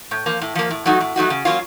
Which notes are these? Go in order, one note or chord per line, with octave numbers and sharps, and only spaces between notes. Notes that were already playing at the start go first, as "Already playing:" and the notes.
A2
F3 A#3
A2
F3 A#3
A2
F#3 A3 D#4 F#4
A2
F#3 A3 D#4 F#4
C#3
F#3 A#3 C#4 F4